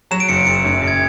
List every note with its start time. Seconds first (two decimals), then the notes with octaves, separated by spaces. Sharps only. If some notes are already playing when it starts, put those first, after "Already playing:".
0.11 F#3 E7
0.20 D7
0.29 F#1 C#7
0.46 F#1 C#7
0.64 F#2
0.81 F#1
0.88 G#6